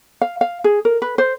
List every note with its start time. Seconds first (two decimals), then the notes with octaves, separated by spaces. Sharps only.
0.21 F5
0.41 F5
0.64 G#4
0.85 A#4
1.02 B4
1.18 C5